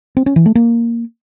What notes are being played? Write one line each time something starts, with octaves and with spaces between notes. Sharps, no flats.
C4
C#4
E3
A3
A#3